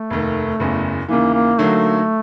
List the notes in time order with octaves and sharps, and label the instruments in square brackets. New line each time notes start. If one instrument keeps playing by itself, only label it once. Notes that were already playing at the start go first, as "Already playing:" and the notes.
Already playing: [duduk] A3
[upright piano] F1 D#2 D#3
F#1 E2 C#3
[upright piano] D#2 C#3 E3 [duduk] A#3
[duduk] A#3
[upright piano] D3 F#3 A#3 D#4 F#4 [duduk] A3